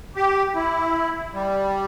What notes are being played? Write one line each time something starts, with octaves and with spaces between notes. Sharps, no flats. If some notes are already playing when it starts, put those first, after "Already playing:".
G4
E4
G3